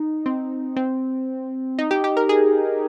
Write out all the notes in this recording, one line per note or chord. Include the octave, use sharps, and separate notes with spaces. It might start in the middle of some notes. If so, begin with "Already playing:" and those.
Already playing: D#4
C4
C4
D#4
G4
G4
A#4
G#4